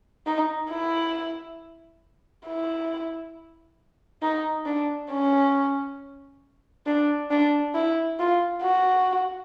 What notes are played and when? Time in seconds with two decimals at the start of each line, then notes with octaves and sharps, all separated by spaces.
0.26 D#4
0.70 E4
2.47 E4
4.22 D#4
4.66 D4
5.11 C#4
6.87 D4
7.31 D4
7.75 E4
8.19 F4
8.63 F#4